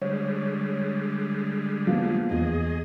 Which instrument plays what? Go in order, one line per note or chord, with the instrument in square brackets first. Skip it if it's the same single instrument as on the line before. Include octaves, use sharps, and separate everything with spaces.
[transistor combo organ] D3 G3 G#3 [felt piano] C#5
[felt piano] F3 A#3 B3
[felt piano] E2 [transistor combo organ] G#4 D#5